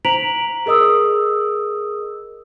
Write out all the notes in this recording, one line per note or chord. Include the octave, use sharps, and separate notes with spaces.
C5 A#5 B6 D7 F7 F#7
G#4 A#4 D#5 D#6 E6